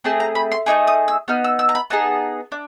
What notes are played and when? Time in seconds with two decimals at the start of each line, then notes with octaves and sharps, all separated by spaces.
0.04 A3 C4 G#4 A5
0.20 A#5
0.35 B5
0.52 C6
0.66 A3 C4 D#4 G#4 D6
0.87 D#6
1.08 E6
1.28 B3 D#4 F6
1.44 E6
1.59 E6
1.69 A#5
1.75 B5
1.90 B3 D#4 G#4 A5
2.52 D4